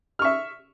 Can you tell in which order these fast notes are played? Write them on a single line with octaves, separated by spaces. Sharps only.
F6 C#6 E5